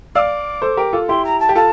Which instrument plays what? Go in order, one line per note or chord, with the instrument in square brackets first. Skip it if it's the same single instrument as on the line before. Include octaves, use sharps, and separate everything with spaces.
[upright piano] D5 F5 [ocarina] D6 E6
[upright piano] A4 C5
G4 A#4
F4 A4
[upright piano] E4 G4 [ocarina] C6
[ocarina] A#5
A5
[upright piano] G4
[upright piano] F4 A4 [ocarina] A5